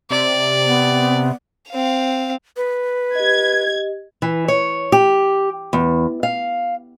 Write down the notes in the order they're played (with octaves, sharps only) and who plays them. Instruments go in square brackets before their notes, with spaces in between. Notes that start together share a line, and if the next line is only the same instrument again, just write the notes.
[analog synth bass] C3 [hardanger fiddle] D5
[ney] B3
[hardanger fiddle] C4 F5
[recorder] B4
[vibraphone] G4 D#5 [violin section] G#6
[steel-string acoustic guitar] E3
C#5
G4
E2
F5